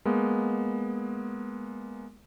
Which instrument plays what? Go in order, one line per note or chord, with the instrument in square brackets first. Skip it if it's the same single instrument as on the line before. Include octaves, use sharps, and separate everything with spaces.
[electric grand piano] G#3 A#3 B3